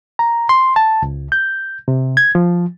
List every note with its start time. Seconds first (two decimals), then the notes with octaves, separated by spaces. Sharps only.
0.19 A#5
0.49 C6
0.76 A5
1.02 C#2
1.32 G6
1.88 C3
2.17 G#6
2.35 F3